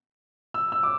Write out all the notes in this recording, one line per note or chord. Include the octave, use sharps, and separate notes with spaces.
E6
E6
D6